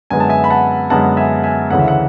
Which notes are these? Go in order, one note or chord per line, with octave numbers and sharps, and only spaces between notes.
F#2 D3 G#3 B3 G#5
A5
E5 G#5
B5
F#5 A5
F#2 D3 G#3 B3 F#5 A5
E5 G#5
E5 G#5
D2 C#3 E3 A3 F#5
E5
F#5